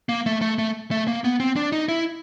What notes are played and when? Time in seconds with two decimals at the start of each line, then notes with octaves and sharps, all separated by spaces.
0.09 A#3
0.26 A3
0.41 A3
0.58 A3
0.91 A3
1.08 A#3
1.24 B3
1.40 C4
1.56 D4
1.72 D#4
1.88 E4